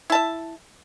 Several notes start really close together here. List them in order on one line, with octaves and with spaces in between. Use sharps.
E4 A5 E5